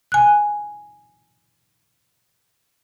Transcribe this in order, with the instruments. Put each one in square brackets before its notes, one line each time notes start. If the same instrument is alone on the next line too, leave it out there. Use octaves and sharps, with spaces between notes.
[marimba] G#5 F#6